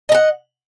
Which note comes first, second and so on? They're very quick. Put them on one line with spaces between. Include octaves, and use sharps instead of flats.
D#5 A#5 F#5